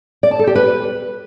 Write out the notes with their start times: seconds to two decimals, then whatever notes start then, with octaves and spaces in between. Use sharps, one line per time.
0.23 D5
0.31 A5
0.39 A4
0.47 G4
0.55 B4